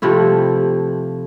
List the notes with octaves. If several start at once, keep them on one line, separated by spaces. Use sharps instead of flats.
C3 F3 A3 E4